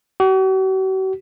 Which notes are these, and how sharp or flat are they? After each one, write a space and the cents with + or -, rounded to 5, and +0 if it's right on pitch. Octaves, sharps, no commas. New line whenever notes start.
F#4 +45